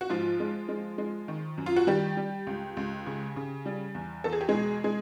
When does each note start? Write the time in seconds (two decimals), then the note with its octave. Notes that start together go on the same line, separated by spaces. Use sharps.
0.01 F#4
0.10 G#2 F3 F4
0.40 G#3
0.69 G#3
0.98 G#3
1.28 D#3
1.58 F#2
1.66 F4
1.76 F#4
1.87 D#3 G3 G4
2.17 G3
2.47 C#2
2.77 C#2
3.06 C#3
3.36 C#3
3.66 G3
3.95 E2
4.24 E2 A4
4.33 G#4
4.41 G4
4.49 G#3 G#4
4.54 B2
4.84 G#3 G#4